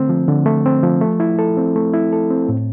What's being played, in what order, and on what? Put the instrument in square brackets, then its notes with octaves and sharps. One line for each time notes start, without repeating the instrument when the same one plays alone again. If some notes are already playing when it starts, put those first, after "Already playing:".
Already playing: [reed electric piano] D3 A3 C4
F3
D3
A3
C4
F3
A3
E4
A4
C4
A3
E4
A4
C4
A2